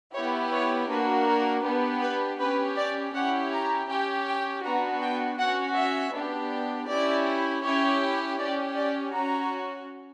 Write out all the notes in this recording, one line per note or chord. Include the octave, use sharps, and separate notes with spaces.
B3 E4 G4 C#5
C#5
A#3 D4 F#4 B4
A#4
B3 D4 G4
B4
C#4 G4 B4
D5
C#4 E4 G4 F#5
A#5
C#4 G4 G5
G5
B3 D4 F#4 A#5
G5
C#4 F#4 F#5
E5
B3 D4 G4
C#4 E4 G4 D5
C#4 E4 G4 C#5
C#4 G4 D5
D5
C#4 F#4 A#5